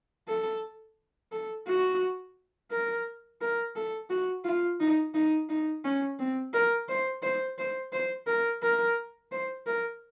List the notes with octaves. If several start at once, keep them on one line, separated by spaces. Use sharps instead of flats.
A4
A4
F#4
A#4
A#4
A4
F#4
F4
D#4
D#4
D#4
C#4
C4
A#4
C5
C5
C5
C5
A#4
A#4
C5
A#4